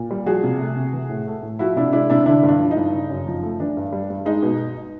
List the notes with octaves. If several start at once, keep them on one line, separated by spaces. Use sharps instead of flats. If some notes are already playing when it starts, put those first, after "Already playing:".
Already playing: A#2
G3
F3 F#4 G#4
C3
A3
C3
E3
A2
A3
A2
F3 E4 F#4
C3 D4 E4
G#3 D4 E4
C3 D4 E4
D3 D4 E4
G2
D4
F3
D#4
G2
C#3
F#2
F3
A3
E3 D4
G2
G3
G2
G#3 D#4
B2